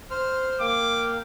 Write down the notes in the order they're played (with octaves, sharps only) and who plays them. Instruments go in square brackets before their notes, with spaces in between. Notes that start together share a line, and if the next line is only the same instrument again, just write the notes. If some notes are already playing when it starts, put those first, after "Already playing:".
[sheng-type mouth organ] C5 C6 F6
[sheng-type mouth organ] A#3 F5 G5 [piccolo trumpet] D6